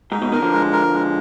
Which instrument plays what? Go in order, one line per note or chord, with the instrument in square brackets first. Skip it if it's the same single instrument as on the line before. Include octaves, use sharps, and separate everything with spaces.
[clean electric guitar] G#2 [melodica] D#4
[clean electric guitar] G#2 B2
[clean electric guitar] B2 D#3 [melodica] A#4
[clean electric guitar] D3 F3
[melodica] G#3
A#4
G#3